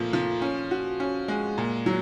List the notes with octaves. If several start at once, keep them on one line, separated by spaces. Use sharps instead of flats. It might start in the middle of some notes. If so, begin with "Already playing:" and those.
Already playing: A#2 F3 A3
F3
C#4
F#4
C#4
G#3
A#2
F#3